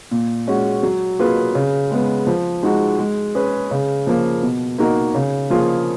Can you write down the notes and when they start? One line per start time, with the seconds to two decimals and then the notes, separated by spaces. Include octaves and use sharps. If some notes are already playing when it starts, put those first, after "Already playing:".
0.11 A#2
0.47 G#3 C#4 F#4
0.83 F#3
1.19 A#3 F4 G#4 B4
1.55 C#3
1.91 G#3 B3
2.27 F3
2.63 G#3 D#4 F#4
2.99 G#3
3.35 C#4 G#4 B4
3.71 C#3
4.07 F3 A#3
4.43 B2
4.78 A#3 D#4 F#4 A#4
5.14 C#3
5.50 F3 A#3 F4 G#4